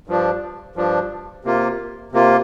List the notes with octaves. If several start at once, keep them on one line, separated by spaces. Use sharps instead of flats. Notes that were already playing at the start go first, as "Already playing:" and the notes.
G2 F3 D4
G2 F3 D4
C3 A#3 F4
C3 A#3 F4